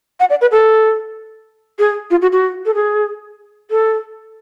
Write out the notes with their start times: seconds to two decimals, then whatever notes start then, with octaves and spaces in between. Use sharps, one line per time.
0.20 F#5
0.30 D5
0.41 B4
0.52 A4
1.79 G#4
2.10 F4
2.22 F#4
2.32 F#4
2.66 A4
2.74 G#4
3.71 A4